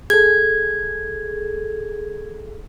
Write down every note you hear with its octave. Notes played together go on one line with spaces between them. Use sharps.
G#4 A4 G#6